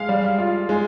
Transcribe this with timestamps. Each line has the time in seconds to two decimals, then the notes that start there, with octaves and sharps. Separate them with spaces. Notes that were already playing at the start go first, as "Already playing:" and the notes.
Already playing: G#3 F5
0.09 G3
0.38 F4
0.69 G#3